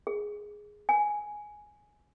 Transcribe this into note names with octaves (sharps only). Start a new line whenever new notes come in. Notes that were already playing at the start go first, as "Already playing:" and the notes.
G#4
G#5